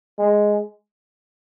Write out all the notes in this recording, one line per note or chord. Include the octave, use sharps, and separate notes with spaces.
G#3